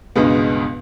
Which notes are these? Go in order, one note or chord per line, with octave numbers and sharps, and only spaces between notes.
C#2 G2 B2 G#3 B3